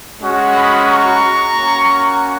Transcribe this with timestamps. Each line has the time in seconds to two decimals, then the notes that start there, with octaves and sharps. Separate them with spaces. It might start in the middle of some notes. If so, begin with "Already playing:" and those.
0.21 G#3 C#4 F#4
0.55 B5 D#6
0.88 A#5 C#6
1.55 A#3 C#4 F#4